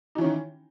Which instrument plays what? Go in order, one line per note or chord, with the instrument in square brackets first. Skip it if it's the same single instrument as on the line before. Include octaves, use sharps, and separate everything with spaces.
[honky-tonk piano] D#4
E3
C#4
D#3